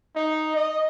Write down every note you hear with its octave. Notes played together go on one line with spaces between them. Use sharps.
D#4
D#5